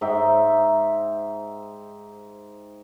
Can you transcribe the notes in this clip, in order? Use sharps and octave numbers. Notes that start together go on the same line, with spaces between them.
G#2 D#4 E5 G5